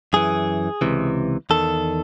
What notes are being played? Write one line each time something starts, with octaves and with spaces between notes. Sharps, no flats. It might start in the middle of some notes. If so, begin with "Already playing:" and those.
F#2 E3 G#4
C#2 C3 E3
E2 D#3 A4